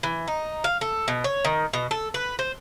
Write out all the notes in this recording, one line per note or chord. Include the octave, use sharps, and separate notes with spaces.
E3
D#4
F5
A4
B2
C#5
D#3
B2
A4
B4
C5